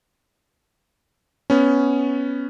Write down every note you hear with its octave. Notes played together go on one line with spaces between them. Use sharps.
B3 C#4